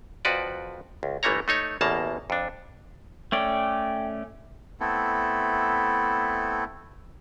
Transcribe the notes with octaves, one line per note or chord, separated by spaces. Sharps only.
F2 F3 F#4 B4 D5
C#2
G1 E3 A3 A#3 C#5 A#5
A3 D#4 C#5
A1 E2 B2 A#3 A5 A#5
F2 D4
A3 C#4 D5 G5
A3 B3 C4 E4 A4